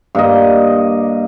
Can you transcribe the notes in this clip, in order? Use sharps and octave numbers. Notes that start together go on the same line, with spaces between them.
G2 A#3 D#5